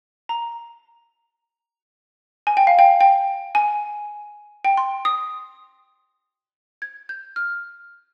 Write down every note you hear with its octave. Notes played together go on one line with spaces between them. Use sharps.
A#5
G#5
G5
F5
G5
G5
G#5
G5
C6
D#6
G#6
G6
F6